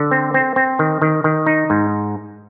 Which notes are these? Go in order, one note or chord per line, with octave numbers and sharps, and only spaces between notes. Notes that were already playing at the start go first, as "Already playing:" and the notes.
Already playing: D3
C4
C4
C4
D#3
D#3
D#3
D#4
G#2